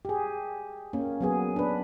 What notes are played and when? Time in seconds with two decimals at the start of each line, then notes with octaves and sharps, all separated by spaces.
0.05 G4 G#4
0.93 A#3 C#4
1.21 F#3 B3 G#4
1.56 D4 B4